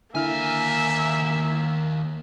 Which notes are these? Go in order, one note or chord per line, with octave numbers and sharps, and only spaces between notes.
D#2 D3 A#3 E4 E5 G#5 F6